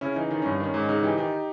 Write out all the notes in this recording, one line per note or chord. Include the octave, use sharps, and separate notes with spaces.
C#3 C#4 E4
E3 D#4
D#3 D#4
G2 C#4
D#3 C#4
G#2
C#3 D#4
E3 D#4 G4
D#3 D#4 G4